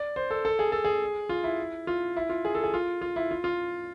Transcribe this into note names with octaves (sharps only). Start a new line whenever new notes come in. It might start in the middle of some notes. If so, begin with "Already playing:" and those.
Already playing: D5
C5
A4
A4
G#4
A4
G#4
F4
E4
F4
E4
F4
G#4
A4
G#4
F4
F4
E4
F4
F4